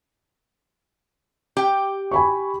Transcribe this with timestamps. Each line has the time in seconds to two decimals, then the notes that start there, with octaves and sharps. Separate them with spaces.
1.57 G4 G5
2.11 G#5 B5 C#6